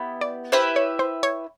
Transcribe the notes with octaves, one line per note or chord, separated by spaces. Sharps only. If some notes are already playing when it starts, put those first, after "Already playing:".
Already playing: B3 E4 G4
D5
E4 G4 B4 C5 E5
C#5
C5
C#5